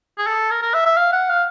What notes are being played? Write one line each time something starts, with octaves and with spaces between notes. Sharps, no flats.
G#4
A4
A#4
A#4
E5
E5
F5
F#5
F5